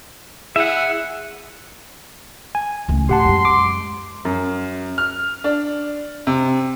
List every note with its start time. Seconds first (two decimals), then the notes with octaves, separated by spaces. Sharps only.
0.56 E4 G#4 E5 F#5
2.55 G#5
2.89 C#2 A3
3.09 A2 G4 F#5 A5 C6
3.25 F#2 G#3
3.45 D6
4.25 F#2
4.98 F6
5.44 D4
6.27 C3